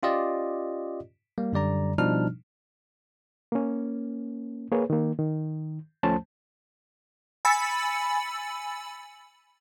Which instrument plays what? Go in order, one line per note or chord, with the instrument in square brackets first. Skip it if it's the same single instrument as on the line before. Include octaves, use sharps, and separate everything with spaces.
[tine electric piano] C#4 F4 G4 D5 D#5
G3 A#3
F#2 D3 G3 D5 A#5
B2 F3 G3 D4 D#4 F6
[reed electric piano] A#3 C#4
A#3 G#4 B4 C#5
D#3 A#3
D#3
D2 F3 A3 C#4 C5 A5
[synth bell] G#5 B5 E6 A6 C#7